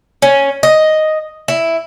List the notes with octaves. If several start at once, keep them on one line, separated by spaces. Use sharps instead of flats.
C#4
D#5
E4